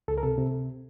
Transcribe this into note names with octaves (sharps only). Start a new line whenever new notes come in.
C#2 A4
A#4
C3 A4
C3